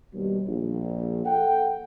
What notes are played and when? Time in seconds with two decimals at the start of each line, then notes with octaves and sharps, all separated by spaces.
0.14 D#2 B2 G3
0.47 A#1
1.26 A4 F#5 G5